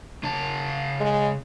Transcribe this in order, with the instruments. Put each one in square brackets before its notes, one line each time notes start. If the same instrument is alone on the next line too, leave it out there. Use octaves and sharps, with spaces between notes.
[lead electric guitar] C#3 A5
[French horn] G#3